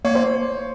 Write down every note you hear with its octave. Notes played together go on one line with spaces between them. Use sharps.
A#3 C#5
C5